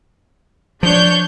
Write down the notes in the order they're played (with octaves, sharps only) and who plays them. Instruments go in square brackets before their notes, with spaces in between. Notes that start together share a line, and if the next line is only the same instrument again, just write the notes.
[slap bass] F3 [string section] D4 C#5 G6